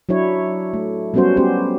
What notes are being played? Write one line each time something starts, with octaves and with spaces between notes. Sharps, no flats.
F#3 D4 E4 C#5
A3
F#3 G3 B3 C#4 F#4 C5
B3 C#4 G4 C5